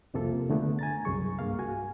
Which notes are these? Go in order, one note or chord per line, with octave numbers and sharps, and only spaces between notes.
C2 F2 C3 A#3 F4 A4
D3 A3 B3 D4
G#5 A#5 A6
C2 F#2 G#4 C#6
G2 A#3 F5
F#4 G#5